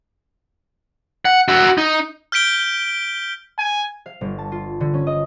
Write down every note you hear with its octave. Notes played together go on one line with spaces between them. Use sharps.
F#5
F#4 E5
D#4
F6 G6 B6 D7 G7
G#5
F5
G1
A5
F4
D3
C#4
D#5